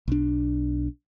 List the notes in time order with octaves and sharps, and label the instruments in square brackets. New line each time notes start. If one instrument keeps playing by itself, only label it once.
[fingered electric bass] B1 D4